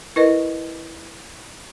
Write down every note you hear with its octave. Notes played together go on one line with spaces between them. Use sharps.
E4 A#4 B4 D#5